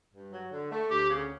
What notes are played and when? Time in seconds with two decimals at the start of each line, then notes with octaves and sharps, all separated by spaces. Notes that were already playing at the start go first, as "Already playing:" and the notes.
0.13 G2
0.32 F#3
0.52 D3
0.71 A3
0.90 D2 G4
1.10 C#3